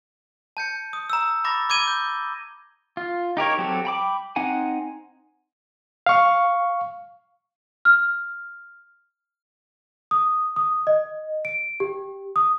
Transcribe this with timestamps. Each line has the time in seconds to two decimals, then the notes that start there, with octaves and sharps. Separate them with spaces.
0.57 A5 G6 C#7
0.93 D#6
1.10 A#5 E6
1.44 A#5 B5 D6 A6 A#6
1.69 B5 D6 G#6 D#7 G7
1.87 G6
2.97 F4
3.37 D#4 G4 A#4 C#5
3.58 F#3 C4 G4 A4
3.85 G5 B5 D6
4.36 C4 D#4 F#5 G#5
6.06 F5 C#6
7.85 F6
10.11 D#6
10.56 D#6
10.87 D#5
11.45 D7
11.80 G4
12.36 D#6